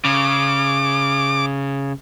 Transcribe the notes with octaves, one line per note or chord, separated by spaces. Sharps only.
C#3 D6